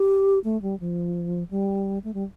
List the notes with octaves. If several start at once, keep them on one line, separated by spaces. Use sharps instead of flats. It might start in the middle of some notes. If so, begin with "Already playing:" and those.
Already playing: G4
A3
G3
F3
G3
A3
G3